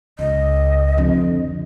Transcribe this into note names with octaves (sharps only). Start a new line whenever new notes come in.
C#2 D#5
F2 D3